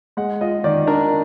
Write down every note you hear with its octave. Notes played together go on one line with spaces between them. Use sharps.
G#3 F#5
F4 D#5
D#3 D5
D4 A#4